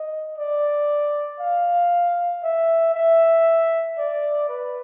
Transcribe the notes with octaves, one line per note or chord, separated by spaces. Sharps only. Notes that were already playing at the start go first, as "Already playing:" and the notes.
Already playing: D#5
D5
F5
E5
E5
D5
B4